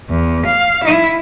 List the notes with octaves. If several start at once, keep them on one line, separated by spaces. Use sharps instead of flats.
E2
F5
E4